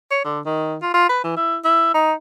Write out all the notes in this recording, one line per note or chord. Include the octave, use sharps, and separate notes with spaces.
C#5
D3
D#3
F4
F4
B4
E3
E4
E4
D#4